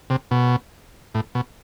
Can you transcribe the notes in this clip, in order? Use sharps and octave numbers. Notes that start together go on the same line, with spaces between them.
C3
B2
A2
B2